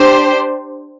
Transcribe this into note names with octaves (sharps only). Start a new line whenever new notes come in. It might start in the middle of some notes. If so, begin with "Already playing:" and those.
Already playing: D4 G4 C5